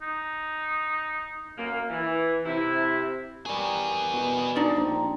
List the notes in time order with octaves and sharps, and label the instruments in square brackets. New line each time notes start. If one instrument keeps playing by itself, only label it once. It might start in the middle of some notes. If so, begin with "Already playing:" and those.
[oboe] D#4
[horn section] F#2 A#3
E3
C3 E4
[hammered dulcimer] G3 A#4 C#6 [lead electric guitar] B3 G#4
[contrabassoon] B2
[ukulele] D4 D#4 D5
[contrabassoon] A#1 [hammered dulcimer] C4 A#5